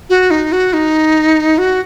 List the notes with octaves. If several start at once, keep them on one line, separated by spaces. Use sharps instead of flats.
F#4
D#4
F#4
D#4
F#4